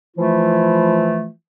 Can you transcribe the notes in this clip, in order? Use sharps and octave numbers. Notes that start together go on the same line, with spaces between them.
E3 F3 A3 E4 F4